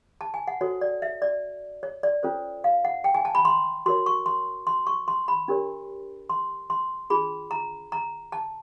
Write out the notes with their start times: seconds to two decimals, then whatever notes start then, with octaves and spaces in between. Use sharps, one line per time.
0.21 A5
0.34 G#5
0.47 F#5
0.61 F#4 A4 C5 C#5
0.81 D5
1.02 E5
1.22 D5
1.83 C#5
2.03 D5
2.23 C#4 F4 A4 C5
2.64 F5
2.85 F#5
3.04 G5
3.14 G#5
3.25 A5
3.35 B5
3.45 C6
3.86 F#4 A#4 C#5 C6
4.06 C#6
4.26 C6
4.67 C6
4.87 C#6
5.08 C6
5.28 B5
5.48 D4 G4 A#4 C#5
6.30 C6
6.70 C6
7.10 D4 F4 G#4 B5
7.51 A#5
7.92 A#5
8.32 A5